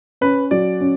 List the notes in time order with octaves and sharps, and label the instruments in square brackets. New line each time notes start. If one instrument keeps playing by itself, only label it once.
[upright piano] C#4 [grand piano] B4
[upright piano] F#3 [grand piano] D5
[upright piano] C#4